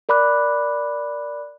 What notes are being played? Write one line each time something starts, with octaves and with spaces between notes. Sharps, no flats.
A#4 D5 B5 D6 F#6